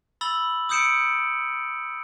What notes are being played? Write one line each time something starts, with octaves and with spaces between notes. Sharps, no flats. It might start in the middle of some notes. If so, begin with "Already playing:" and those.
B5 E6 A6 F#7 G7
D#6 E6 G6 C#7 D7 E7